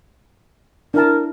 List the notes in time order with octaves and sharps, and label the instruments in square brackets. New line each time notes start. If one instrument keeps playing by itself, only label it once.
[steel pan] D4 E4 A5 [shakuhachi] A#4